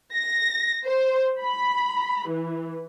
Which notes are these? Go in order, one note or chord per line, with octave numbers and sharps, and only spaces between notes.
A#6
C5
B5
E3